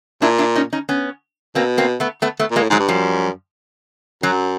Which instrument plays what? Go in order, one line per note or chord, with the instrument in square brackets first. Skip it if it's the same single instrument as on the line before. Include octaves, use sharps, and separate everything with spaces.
[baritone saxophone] A#2 [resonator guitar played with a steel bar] D4 E4
[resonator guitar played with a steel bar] D4 E4
C#4 D#4
C#4 D#4
B3 C#4
[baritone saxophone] B2 [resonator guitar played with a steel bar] A#3 C4
[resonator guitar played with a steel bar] A#3 C4
A3 B3
A3 B3
A3 B3
[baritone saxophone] A#2
[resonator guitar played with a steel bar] G#3 A#3
[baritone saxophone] A2
[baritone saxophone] G#2 [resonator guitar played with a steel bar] F#3 G#3
[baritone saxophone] G2
[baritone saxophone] F#2 [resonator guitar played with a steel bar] F3 G3
[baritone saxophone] F#2 [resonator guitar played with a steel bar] F#3